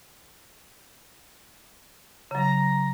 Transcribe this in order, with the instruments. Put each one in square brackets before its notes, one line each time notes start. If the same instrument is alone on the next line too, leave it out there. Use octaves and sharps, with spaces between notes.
[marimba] C#3 F#3 [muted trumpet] A#5